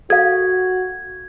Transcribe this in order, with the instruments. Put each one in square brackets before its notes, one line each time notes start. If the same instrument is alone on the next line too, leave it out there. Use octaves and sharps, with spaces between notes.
[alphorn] F#4 [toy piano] A4 F5 [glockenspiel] G#6